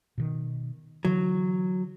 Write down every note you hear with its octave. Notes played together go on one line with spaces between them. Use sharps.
B2 D#3
D3 E3 F#3